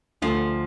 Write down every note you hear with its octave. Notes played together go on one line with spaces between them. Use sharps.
D2 D3 F3